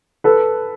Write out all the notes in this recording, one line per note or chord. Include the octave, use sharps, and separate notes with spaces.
A4 B4